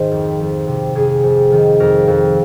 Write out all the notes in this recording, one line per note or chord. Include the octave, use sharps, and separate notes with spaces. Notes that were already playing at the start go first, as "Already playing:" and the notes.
Already playing: G#2 D#3 C5
F2
F2
C3
F2 G#4
F2
D#3
F2 A#4
F2